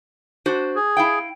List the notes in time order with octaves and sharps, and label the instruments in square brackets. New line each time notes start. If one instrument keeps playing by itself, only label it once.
[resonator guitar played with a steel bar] D4 F#4 C5
[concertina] G#4
[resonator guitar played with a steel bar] E4 F5 G5